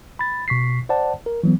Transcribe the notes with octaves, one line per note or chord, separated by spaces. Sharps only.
B5 A6
B2 C#6 B6 C7
C5 D5 F#5 A5
A#4
E3 F#3 B3